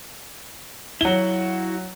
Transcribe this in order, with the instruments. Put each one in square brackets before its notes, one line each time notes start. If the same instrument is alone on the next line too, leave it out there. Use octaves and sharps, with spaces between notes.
[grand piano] F#3 G7 [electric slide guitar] E4 F#4